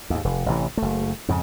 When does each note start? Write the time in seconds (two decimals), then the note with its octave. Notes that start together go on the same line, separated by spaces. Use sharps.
0.10 D#2 G#2
0.25 F1
0.46 A1 C3 E3
0.77 F#1 A3
1.28 F2 G#2 C#3